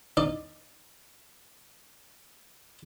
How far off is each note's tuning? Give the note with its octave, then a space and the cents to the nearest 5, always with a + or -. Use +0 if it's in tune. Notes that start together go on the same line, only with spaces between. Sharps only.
D#4 -10 D5 +5